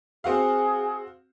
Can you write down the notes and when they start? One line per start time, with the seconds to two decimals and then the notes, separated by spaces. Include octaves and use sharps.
0.24 C4 F#4 G#4 F5